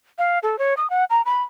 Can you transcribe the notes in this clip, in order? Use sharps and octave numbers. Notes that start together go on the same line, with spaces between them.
F5
A4
C#5
D#6
F#5
A#5
B5